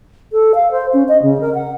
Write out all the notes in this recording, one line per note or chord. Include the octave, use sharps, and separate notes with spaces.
A4
F5
C5
C#4
D#5
C#3
A#4
F#5